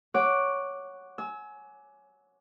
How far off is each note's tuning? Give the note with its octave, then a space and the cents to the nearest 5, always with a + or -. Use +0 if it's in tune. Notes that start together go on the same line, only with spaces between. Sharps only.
C#5 +0 F#5 +0 D6 +0
G#5 +20 E6 -25